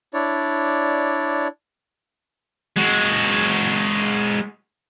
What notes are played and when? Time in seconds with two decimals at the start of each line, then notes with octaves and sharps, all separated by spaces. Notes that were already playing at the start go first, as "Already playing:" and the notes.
0.14 D4 E4 C#5 D5
2.77 G#3 F#4